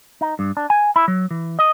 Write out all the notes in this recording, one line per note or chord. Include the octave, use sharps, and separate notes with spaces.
D#4
G2
D4
G#5
E4
F#3
E3
D#5